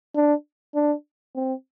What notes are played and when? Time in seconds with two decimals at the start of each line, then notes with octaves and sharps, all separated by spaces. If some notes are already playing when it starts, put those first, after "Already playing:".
0.15 D4
0.75 D4
1.35 C4